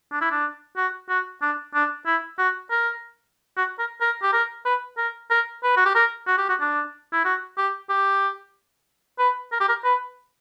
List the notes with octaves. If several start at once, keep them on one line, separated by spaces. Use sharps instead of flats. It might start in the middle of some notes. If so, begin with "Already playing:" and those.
D4
E4
D4
F#4
F#4
D4
D4
E4
F#4
A#4
F#4
A#4
A#4
G4
A#4
B4
A#4
A#4
B4
F#4
G4
A#4
F#4
G4
F#4
D4
E4
F#4
G4
G4
B4
A#4
G4
A#4
B4